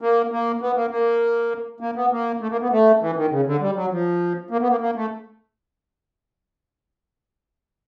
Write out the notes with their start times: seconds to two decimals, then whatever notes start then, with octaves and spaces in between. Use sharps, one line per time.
0.01 A#3
0.31 A#3
0.61 B3
0.76 A#3
0.90 A#3
1.80 A#3
1.96 B3
2.11 A#3
2.41 A3
2.50 A#3
2.61 B3
2.71 A3
3.01 E3
3.16 D#3
3.31 C#3
3.46 D3
3.60 G3
3.76 F#3
3.91 F3
4.50 A#3
4.61 B3
4.70 A#3
4.80 A#3
4.96 A3